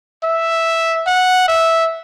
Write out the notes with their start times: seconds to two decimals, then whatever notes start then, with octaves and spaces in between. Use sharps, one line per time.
0.23 E5
1.06 F#5
1.48 E5